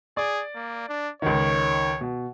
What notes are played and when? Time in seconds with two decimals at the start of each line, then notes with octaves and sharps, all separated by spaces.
0.17 G#4 D5
0.55 A#3
0.89 D4
1.22 C#2 D#3 C#5
2.01 B2